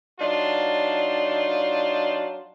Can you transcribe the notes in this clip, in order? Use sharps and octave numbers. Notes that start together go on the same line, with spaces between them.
F#3 D4 D#4 F4